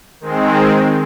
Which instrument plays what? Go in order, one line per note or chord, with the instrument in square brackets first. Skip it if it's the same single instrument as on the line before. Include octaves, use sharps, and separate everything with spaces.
[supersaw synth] D#3 G#3 C4